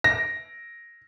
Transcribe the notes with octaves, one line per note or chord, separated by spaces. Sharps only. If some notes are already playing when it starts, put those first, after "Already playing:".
A#6